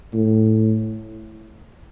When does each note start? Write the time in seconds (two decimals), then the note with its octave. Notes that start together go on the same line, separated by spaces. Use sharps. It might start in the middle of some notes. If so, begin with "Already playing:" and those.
0.14 A2